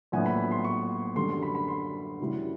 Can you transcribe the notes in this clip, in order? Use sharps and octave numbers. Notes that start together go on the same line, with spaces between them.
A#1 A2 F#3 B3 G#5
B5
C6
C#6
F#2 D3 G3 C6
C6
B5
B5
C6
F#2 C#3 E3 G3